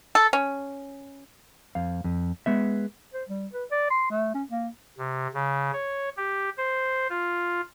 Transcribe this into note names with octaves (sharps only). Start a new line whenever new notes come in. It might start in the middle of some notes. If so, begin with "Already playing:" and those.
A4
C#4
F2 F5
F2
G#3 B3 E5
C5
G3
B4
D5
C6
A3
C#4
A#3
C3
C#3
C#5
G4
C5
F4